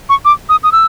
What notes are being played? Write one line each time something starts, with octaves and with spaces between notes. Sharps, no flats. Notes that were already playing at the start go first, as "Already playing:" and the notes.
C#6
D6
D#6
D#6
E6